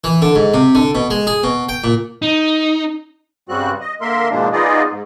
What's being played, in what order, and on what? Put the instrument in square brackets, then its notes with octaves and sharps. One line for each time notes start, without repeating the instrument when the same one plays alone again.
[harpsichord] E3
D3
G#2
C3
D3
B2
G#3
G#4
B2
G5
A#2
[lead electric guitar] D#4
[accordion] G2 C#3 G3 C4 F#4 F#6
D#5
D3 A#3 A#4 E5 C6
G#2 B2 F3 G#3 A#3 D4
B3 D#4 F4 G#4 D5 D#5
G#2